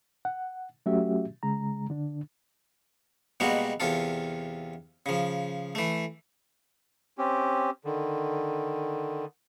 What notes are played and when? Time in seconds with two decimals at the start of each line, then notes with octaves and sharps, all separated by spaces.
0.25 F#5
0.86 F#3 A3 C#4 F#4 G4 E5
1.43 C#3 G#3 A#5
1.90 D3 D4
3.40 B2 G3 G#3 A#3 F#4
3.80 E2 C3 F4 A4
5.06 C#3 F3
5.75 E3 A3
7.18 C4 C#4 G4
7.85 D3 D#3